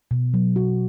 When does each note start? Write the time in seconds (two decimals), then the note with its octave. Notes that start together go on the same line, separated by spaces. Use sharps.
0.11 B2
0.34 F#3
0.56 F#4